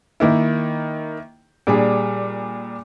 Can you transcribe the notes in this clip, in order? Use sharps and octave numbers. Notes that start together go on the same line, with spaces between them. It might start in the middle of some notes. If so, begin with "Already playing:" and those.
D#3 A#3 E4
A#2 G3 D4 G#4